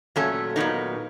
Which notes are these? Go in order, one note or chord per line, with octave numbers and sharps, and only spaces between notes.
A#2 F#3 A3 C#4 A4
A#2 F#3 B3 D#4 A#4